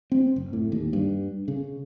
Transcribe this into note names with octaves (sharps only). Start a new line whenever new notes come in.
C4
F#1
A2
D#2
G2
C#3